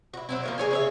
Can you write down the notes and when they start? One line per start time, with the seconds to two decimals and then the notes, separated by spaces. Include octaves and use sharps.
0.14 E4 F#4
0.29 F#3 C4 E4
0.43 F3 A#3 C#5
0.58 G#4 C#5 G#5
0.71 C#3 C#5 E5